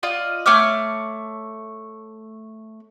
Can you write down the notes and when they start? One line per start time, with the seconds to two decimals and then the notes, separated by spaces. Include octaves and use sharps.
0.03 F4 D5 D#5
0.46 A3 C#5 D6 F6